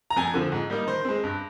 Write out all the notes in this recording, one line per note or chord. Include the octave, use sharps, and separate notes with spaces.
A#5
F2 G#5
D3 F3 C4
G#2
G3 A#3 D#4
D#3 C5
G#3 C4
G2